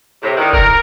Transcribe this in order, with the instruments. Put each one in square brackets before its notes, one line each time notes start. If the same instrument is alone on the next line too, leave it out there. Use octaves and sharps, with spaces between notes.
[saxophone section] A2 C3
A2 D3 D#3
[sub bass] F1 [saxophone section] A#4